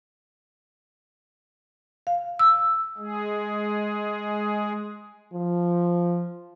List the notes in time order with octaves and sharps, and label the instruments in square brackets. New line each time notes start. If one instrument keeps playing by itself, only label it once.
[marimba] F5
E6
[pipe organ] G#3 G#4
[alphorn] F3